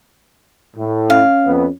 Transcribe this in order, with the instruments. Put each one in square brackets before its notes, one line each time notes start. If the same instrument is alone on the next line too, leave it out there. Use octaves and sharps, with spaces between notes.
[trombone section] A2
[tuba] C#4 [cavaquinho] F5
[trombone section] F2 B3